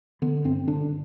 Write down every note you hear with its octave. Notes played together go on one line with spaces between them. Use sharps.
D3 B3
G2 C4
D3 D4